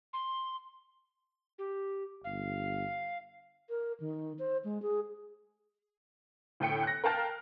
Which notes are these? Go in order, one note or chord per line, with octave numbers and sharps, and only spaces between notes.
C6
G4
G1 F5
A#4
D#3
C5
G#3
G#4
D2 A2 G5 C#7
F#6 A#6
A#4 F5 G5 A5 F6